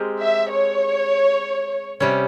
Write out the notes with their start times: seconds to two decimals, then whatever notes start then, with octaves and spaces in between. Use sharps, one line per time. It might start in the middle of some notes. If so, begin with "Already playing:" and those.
Already playing: G#3 C4 G4 A#4
0.22 E5
0.51 C#5
2.00 C3 G3 C#4